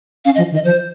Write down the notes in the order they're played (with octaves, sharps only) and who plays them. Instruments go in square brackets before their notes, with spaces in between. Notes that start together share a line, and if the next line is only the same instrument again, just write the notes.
[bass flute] C#4 [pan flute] F5
[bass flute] F3 [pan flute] D#5
[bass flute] D#3
[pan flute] D#5
[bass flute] F3 [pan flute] C5